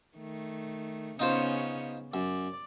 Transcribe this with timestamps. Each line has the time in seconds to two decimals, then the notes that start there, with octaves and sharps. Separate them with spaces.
0.17 D#3 A3
1.19 C#3 B3 C#4 D#4 F4 C5
2.14 F#2 D5